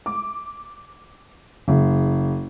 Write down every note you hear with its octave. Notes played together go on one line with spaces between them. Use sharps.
D6
F#1